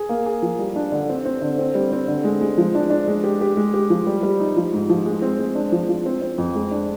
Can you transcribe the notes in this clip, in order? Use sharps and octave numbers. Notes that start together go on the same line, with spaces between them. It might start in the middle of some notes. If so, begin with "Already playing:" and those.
Already playing: G#4
A#3
G#4
F3
G3
D4
D3
C4
C4
D3
C4
G3
C4
D3
G#3
G#3
F3
D4
D4
G#3
G4
G4
G#3
G4
F3
G3
G3
D#4
F3
G#2
F3
G#3
C4
G#3
D4
F3
F3
C4
C4
F2
G#3
D4